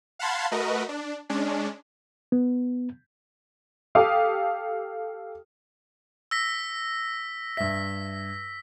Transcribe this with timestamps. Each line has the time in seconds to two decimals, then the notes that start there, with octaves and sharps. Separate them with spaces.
0.19 F5 F#5 A5 B5 C6 G#6
0.51 A3 F#4 A#4 B4 D#5
0.89 D4
1.29 G#3 C#4 D4
2.32 B3
3.95 G4 A4 F5 D6 D#6
6.31 E6 A#6 B6
7.57 G2 E5 B6